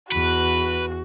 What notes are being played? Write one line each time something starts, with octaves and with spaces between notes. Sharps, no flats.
E2 F#4 B4